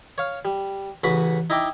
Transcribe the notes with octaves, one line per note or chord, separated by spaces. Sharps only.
C#5 F5
G3
A1 C#3 F#4 B4 B5
D#4 E4 D#5 G5 D6